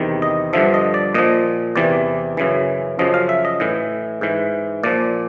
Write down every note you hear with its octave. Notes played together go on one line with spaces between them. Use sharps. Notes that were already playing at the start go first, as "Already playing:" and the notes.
Already playing: E2 C3 D#3
D#5
G2 D3 F3 E5
D#5
D5
A#2 F3 D#5
E2 C3 E3 D5
F#2 C#3 E3
F#2 C#3 F3 D#5
F5
E5
D#5
A2 E3
G#2 E3
A#2 F3 D5